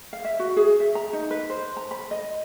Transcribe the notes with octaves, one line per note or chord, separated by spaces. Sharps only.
F5
E5
F#4
G#4
E5
A#5
D#4
B4
C5
A#5
B5
D#5